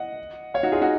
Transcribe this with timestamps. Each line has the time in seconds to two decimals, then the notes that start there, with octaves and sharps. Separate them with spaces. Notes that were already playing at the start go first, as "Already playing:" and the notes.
Already playing: D#5 F#5
0.54 C#5 F5
0.63 D#4 F#4
0.72 F4 G#4
0.82 D#4 F#4